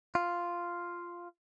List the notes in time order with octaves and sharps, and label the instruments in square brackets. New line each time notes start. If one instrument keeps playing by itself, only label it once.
[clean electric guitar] F4